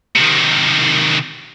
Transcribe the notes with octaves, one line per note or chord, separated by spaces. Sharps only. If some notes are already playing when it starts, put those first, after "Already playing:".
C3 D#3